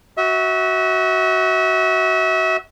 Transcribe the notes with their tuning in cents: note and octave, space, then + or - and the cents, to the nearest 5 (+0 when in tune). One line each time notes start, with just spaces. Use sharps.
F#4 +10 E5 -30